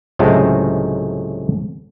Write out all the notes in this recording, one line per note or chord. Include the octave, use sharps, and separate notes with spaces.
C#2 A2 C3 F#3 G#3 A3